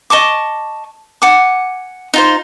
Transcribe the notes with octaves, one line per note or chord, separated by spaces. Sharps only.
D#5 A5 C#6 D6
F#5 G#5 D6
D#4 F4 C5